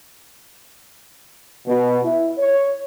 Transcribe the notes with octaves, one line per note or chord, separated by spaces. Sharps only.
B2
E4
C#5